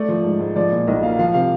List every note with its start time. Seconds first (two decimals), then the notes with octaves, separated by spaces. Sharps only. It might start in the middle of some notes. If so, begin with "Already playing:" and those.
Already playing: A3 D5
0.08 F3
0.24 G#2
0.40 G#2
0.56 F3 D5
0.71 A#2
0.87 B1 D#5
1.03 A#3 F5
1.19 F3 F5
1.34 C3 F5